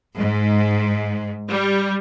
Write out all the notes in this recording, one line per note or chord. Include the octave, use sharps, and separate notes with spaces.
G#2
G3